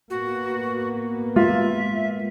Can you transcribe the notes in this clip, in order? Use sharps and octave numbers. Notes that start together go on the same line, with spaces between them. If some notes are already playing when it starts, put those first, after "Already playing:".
A2 A#3 B3 F#4
G#3 F4 E5